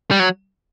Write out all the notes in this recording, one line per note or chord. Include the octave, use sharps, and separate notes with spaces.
G3
F#3